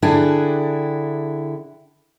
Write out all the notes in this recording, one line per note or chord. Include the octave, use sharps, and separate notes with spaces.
D3 D4 E4 G#4 G5